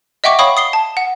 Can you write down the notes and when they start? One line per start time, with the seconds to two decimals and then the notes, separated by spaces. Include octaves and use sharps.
0.24 D#5 E5 F#5 G5 C#6 D6
0.39 C#5 F5 G5 B5 C#6 D#6
0.57 D#6 C7 G7
0.73 A5
0.97 F#5